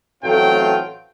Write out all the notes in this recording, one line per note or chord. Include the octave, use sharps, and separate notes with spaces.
A1 F#3 A3 C4 F4 G5